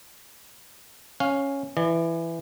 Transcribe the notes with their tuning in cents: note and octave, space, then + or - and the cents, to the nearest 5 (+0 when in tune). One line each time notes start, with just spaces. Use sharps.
C#4 -5 F5 +10
E3 +10 D5 +40